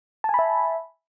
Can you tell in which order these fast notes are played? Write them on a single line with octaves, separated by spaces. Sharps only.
A5 G#5 B5 E5